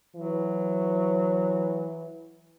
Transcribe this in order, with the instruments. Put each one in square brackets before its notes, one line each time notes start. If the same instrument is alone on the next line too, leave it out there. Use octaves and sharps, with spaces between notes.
[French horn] E3 [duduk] F#3